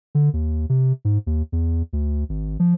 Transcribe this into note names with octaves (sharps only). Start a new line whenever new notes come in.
D3
D#2
C3
G#2
D#2
E2
D2
G#1
F3